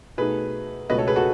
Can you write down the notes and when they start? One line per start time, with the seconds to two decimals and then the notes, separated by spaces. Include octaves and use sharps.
0.17 B2 A3 D#4 G#4 B4
0.90 C#2 B2 A3 C#4 B4 D#5
0.98 A4 C#5
1.07 G#4 B4
1.16 F#4 A4